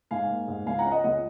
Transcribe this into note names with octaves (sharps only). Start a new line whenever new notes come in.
G#2 F5 G#5
A#3
G#2
C#2 F5 G#5
F#5 A#5
C#4
D#5 F#5
C#2 D#5 F#5